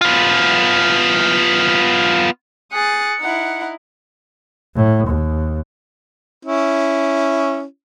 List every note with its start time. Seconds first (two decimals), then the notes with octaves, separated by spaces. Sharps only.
0.01 B3 F4
2.71 G#4 D#6 F#6 A6 C#7
3.20 D#4 E4 F#5
4.75 A2
5.07 D#2
6.45 C#4 E4